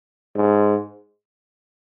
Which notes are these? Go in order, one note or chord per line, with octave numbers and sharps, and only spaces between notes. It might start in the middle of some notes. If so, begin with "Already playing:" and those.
G#2